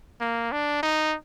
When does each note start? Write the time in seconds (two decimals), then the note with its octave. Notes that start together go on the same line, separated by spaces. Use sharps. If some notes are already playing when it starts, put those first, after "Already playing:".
0.21 A#3
0.52 D4
0.83 D#4